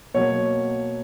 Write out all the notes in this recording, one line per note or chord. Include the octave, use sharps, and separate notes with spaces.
B2 F#3 A#3 C#5